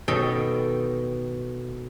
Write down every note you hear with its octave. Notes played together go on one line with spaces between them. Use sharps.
B2 D#3 A4 D#5 G5